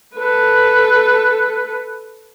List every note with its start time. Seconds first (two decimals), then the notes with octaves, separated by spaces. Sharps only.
0.15 A4 B4